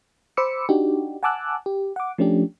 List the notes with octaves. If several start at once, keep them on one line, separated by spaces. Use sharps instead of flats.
C5 B5 D6 E6 C#7
D4 D#4 F#4 G4
F#5 G#5 A5 D6 E6 F#6
G4
F#5 D6
F3 A3 C#4 D4 G4